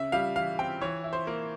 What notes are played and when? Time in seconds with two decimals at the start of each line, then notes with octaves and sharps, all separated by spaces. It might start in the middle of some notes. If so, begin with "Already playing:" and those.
Already playing: C#3 E5
0.12 G3 F5
0.36 E3 F5
0.59 C4 G5
0.81 E3 C#5
1.04 E4
1.13 C5
1.27 A#3